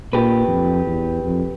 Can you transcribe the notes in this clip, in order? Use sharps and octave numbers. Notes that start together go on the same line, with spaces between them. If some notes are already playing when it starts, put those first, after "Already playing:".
A#2 G4 B4
F2
E2
F2